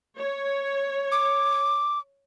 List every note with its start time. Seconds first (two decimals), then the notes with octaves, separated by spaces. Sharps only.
0.16 C#5
1.12 D6